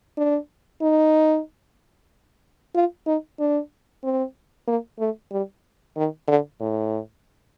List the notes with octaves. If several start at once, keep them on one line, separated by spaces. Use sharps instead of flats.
D4
D#4
F4
D#4
D4
C4
A#3
A3
G3
D#3
D3
A2